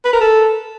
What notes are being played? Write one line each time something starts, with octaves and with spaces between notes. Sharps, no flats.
B4
A#4
A4